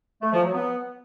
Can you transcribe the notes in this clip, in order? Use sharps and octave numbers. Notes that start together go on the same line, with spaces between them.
A3
F3
F#3
B3